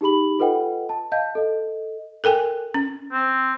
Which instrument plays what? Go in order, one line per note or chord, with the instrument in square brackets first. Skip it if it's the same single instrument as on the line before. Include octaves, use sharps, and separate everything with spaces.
[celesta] D#4 G4 G#4 B5 F#7
F4 A4 B4 D#5 F#5 G5
A5
D#5 F5 A5 G6
A4 D#5
[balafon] A4 A#4 G5 G#5
C#4
[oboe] C4